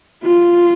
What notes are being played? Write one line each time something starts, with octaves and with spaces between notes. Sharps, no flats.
F4